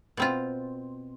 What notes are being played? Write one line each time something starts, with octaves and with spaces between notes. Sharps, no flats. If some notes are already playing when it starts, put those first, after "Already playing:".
B2 C4 F4